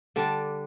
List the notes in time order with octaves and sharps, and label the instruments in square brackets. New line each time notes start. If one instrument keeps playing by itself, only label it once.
[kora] D3 G3 D4 [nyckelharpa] A5